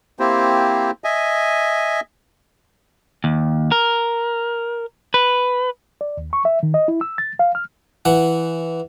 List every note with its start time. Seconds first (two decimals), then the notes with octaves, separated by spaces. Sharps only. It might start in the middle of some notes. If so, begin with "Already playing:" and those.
0.19 A#3 C4 E4 G4 C5
1.04 D#5 E5 G#5
3.24 D#2
3.72 A#4
5.14 B4
6.01 D5
6.17 D#2
6.33 C#6
6.45 E5
6.63 D#3
6.74 D#5
6.88 E4
7.01 E6
7.18 A6
7.39 F5
7.55 F6
8.05 E3 F#5